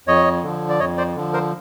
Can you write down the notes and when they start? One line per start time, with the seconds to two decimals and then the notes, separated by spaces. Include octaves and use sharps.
0.07 F2 C#5 D#5
0.43 D3 F3
0.69 D5
0.80 F2 C#5 D#5
0.98 C5 D5
1.16 D3 F3
1.33 A#4 C5